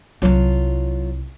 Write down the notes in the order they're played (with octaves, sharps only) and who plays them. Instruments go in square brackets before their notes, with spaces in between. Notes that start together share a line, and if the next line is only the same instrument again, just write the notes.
[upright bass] C2 E4 [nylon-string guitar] F#3 F4 A5